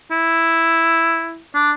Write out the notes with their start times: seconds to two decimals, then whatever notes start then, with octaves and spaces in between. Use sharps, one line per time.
0.11 E4
1.55 D4